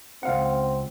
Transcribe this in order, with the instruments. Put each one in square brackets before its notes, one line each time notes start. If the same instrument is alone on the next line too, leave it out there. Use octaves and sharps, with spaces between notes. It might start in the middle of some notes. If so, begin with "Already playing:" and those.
[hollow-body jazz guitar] C#2 F5 F#5 [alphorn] C4